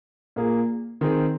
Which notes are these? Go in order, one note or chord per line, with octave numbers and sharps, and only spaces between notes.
A#2 A#3 G#4
D#3 C4 G#4